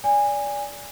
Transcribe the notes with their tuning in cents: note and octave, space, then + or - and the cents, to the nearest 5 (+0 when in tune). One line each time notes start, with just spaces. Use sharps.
D5 -25 G#5 -20